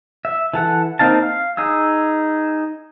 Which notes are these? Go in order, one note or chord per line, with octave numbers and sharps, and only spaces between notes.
E5
E3 A4 F#5
A#3 C4 D#4 F5 A5
F5
D#4 G#4 E6